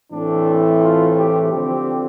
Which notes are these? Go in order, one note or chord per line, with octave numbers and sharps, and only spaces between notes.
A2 E3 A3 C4 D4
F4
G4
D3 F3 C4 G4